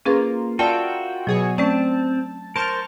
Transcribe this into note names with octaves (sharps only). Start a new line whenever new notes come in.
A#3 C#4 F4 G#4 B4
F4 F#4 A#4 D5 E5 F#5 G5 A5
B2 F#3 G#4 C#5
A3 C4 C#4 D5 A5
A#4 C5 A5 C#6 F6